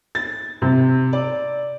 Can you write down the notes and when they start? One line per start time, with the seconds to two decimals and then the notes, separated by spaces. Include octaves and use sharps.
0.15 A6
0.62 C3
1.13 D5